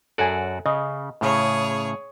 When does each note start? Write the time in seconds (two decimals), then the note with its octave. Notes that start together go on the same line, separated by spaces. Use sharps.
0.18 F#2 F#4 A4 D5 G#5
0.66 C#3 D#5
1.21 A2 C#3 G#4 C#5